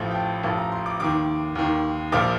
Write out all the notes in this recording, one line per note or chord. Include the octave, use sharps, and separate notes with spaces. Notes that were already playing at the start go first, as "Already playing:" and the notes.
Already playing: A1 A2 F3
G5
A5
A1 A2 F3 A5
A#5
C6
D6
D#2 D#3 D6
D#2 D#3
A#1 A#2 F3 D6